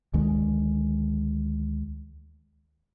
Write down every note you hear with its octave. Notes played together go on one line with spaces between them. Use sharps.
D2 D#3 G#3